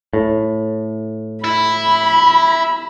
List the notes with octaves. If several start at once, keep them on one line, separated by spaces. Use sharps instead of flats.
A2
E4 B5